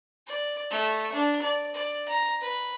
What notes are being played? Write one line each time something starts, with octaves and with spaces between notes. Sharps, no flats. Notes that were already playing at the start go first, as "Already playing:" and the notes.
D5
A3
D4
D5
D5
A#5
B4